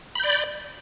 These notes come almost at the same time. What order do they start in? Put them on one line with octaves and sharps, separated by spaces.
B5 G6 D5